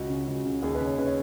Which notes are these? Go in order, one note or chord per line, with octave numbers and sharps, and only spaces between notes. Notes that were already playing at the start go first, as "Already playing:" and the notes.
Already playing: C#2 F#4
C#3
C#2 F#4
C#3
D#2 G#4
B4
C#3
C#5
C#3 B4
C#5